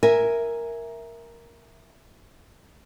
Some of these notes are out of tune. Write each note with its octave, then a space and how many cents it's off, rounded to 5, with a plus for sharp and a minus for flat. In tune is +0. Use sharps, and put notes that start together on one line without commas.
A#4 +0 E5 +0 G#5 +0